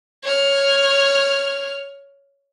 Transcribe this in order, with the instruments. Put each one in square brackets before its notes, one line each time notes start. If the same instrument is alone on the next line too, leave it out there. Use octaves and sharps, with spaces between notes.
[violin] C#5 F6